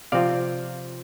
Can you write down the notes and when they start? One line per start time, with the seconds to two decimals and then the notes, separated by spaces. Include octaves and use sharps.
0.12 C3 F3 C4 F4 D5 F5